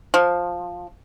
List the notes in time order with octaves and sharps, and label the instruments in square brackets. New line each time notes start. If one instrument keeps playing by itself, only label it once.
[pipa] F3